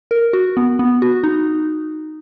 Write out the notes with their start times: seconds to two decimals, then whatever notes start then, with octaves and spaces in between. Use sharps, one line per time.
0.11 A#4
0.33 F#4
0.57 B3
0.79 B3
1.02 F#4
1.24 D#4